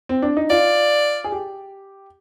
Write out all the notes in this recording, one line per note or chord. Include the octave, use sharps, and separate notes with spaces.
C4
D4
D#4
F4 D5
G#4
G4